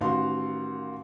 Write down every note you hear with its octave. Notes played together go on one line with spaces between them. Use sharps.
A1 D#3 F#4 F5 C6